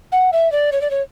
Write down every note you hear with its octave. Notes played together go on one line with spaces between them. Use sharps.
F#5
E5
D5
C#5
D5
C#5